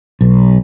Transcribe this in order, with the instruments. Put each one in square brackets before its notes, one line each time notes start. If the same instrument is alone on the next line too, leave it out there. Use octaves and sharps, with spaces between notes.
[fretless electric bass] B1